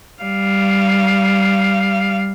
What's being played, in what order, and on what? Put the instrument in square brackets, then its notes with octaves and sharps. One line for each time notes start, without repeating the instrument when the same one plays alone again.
[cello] G3 F5